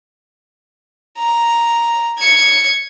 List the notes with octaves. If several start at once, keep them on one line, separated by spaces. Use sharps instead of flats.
A#5
G#6 C#7